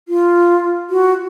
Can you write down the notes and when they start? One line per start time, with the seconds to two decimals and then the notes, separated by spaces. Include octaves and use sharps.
0.08 F4
0.90 F#4